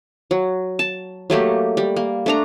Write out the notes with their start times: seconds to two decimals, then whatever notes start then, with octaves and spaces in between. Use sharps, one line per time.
0.31 F#3
0.79 A5
1.30 F#3 A3 A#3 G4
1.77 G3
1.96 A#3
2.26 A3 D4 A#5